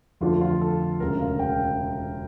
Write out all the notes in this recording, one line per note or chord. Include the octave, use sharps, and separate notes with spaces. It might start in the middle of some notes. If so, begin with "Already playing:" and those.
F2 D3 F3 A3 F4
F4
A4
E1 D2 C#3 A#4
F5
G5